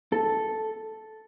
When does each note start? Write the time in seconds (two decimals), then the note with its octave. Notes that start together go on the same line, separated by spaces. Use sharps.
0.12 A4